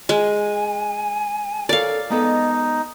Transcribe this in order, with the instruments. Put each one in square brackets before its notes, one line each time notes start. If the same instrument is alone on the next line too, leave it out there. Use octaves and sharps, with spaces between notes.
[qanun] G#3 [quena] G#5
[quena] A4 [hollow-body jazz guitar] A#4 C#5 [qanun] D5 F5
[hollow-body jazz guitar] G#3 B3 A4 [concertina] D#4 [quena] D#5